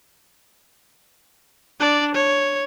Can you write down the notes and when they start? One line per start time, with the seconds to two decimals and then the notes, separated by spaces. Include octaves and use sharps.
1.79 D4 D5
2.14 C#5